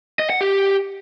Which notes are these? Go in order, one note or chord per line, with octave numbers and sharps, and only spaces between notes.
D#5
F#5
G4